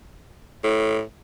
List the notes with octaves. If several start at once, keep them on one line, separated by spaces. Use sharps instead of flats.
A2